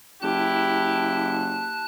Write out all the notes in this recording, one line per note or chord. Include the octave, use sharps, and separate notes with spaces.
F#1 E4 G4 A5 F#6